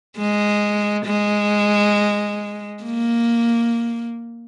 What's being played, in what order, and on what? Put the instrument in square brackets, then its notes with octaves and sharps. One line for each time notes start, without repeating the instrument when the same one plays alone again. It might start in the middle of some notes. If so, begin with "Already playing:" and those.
[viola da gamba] G#3
G#3
A#3